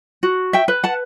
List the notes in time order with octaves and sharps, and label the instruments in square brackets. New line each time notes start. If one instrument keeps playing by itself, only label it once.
[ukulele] F#4
E5 G5
B4
F#5 A5